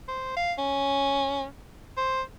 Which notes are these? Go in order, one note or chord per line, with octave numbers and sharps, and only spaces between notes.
C5
F5
C#4
C5